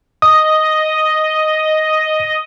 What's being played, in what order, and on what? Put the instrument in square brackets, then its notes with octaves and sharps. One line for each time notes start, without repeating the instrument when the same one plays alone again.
[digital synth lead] D#5 [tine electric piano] D#6